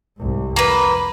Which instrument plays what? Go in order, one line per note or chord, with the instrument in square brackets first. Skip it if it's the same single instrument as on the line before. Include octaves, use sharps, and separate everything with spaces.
[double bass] C2 G#2
[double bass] F2 [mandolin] A#3 B4